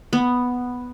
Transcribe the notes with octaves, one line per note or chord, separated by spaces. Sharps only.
B3